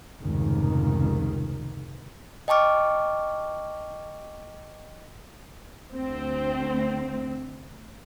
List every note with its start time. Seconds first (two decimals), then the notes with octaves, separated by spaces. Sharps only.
0.22 F1 C#2 G#2 D#3
2.48 D#5 G5 A5 C#6 D6 F6
5.95 D2 C4